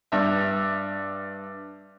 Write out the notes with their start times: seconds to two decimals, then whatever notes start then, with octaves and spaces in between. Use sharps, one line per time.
0.12 G2 E5